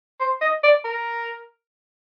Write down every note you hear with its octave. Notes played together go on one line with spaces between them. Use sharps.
C5
D#5
D5
A#4